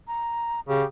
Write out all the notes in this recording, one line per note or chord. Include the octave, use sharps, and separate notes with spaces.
A#5
C#3 G4